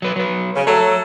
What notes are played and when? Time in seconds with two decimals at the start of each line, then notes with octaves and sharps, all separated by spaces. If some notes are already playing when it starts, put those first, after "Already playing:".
0.02 F#3 B4
0.16 F#3 B4
0.55 C#3
0.67 F#3 A3 A4 C#5 A#5